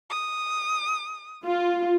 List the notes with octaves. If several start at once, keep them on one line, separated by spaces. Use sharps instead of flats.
D#6
F4